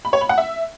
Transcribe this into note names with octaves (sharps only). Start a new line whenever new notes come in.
B5
C#5
B5
F#5
E5